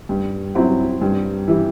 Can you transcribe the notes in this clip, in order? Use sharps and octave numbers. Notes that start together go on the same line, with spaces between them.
G2
F#3 C4 E4
G2
E3 G3